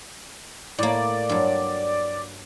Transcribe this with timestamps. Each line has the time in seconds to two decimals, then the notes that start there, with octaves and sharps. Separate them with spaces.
0.78 A2 A#3 D5
1.29 G2 F#3